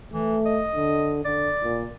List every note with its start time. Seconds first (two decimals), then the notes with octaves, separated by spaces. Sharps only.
0.13 E3 A3
0.45 D#5
0.75 D3
1.25 D3 D5
1.63 A#2